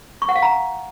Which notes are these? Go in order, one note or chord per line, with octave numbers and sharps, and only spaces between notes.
C#6
F#5
F5
A#5